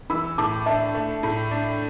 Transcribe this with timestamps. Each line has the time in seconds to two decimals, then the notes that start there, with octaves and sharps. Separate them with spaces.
0.10 E3 B5 E6
0.38 A2 A5 D6
0.66 D4 E5 A5
0.94 A3
1.23 A2
1.51 D4